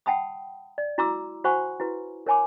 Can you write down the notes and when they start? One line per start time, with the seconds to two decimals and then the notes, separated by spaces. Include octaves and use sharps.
0.06 F#5 G5 A5 B5 D#6
0.78 D5
0.98 E4 F#4 A#5 C6 D6 E6
1.44 F#4 C5 F#5 G#5 B5 C#6
1.80 E4 F#4 B4
2.27 A#4 C#5 G#5 B5 D6